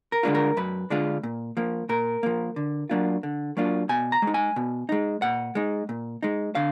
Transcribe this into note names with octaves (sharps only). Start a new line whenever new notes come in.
A#4
D3 G#3 D4 F4
A#4
F#2 B4
D3 G#3 D4 F4
A#2
F3 A#3
A#2 A#4
F3 A#3
D3
F#3 A#3 D4 F4
D3
F#3 A#3 D4 F4
B2 G#5
A#5
G#3
D#4
G#5
B2
G#3 D#4
A#2 F#5
G#3 D#4
A#2
G#3 D#4
D3 F5